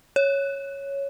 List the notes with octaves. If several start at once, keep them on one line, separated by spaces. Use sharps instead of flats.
C#5